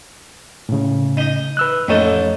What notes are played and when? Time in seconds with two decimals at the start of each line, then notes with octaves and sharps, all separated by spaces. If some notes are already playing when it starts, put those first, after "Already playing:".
0.69 A2 C#3
1.17 D#4 D#5
1.57 B4 E6 F#6
1.88 A1 F2 D#4 A4 C#5